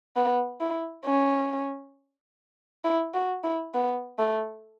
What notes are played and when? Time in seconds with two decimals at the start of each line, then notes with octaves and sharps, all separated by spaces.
0.16 B3
0.61 E4
1.05 C#4
2.85 E4
3.15 F#4
3.44 E4
3.74 B3
4.19 A3